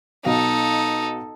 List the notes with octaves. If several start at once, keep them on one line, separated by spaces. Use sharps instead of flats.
B1 B2 D#4 A4 F5